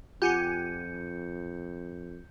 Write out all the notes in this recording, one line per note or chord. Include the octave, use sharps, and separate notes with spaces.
F2 F4 G4 F#5 G#5 G6 C#7